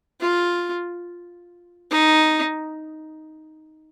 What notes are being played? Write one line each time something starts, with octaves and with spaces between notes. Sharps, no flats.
F4
D#4